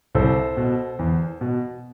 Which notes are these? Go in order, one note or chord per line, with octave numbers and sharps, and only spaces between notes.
C2 A4 C5
B2
E2
B2